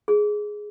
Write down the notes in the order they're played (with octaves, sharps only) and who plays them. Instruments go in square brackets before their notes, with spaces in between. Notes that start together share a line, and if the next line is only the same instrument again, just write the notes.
[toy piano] G#4